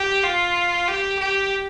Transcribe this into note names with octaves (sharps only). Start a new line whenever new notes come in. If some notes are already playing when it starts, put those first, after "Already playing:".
Already playing: G4
F4
G4
G4